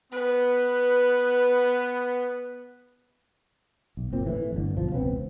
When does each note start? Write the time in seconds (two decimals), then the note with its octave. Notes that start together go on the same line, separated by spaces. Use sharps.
0.12 B3 B4
3.97 B1
4.12 F#1 A#2 C4
4.26 A2 E3
4.52 D1 G1 D3
4.76 B1 F3
4.92 E1 C#2 B3 C4